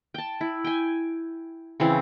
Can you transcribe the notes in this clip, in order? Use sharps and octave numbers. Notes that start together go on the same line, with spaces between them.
G5 A5
E4
G5 G#5
C#3 E3 C4